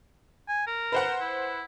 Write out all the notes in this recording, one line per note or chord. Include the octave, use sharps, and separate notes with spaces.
G#5
A#4
B4 C5 F#5
E4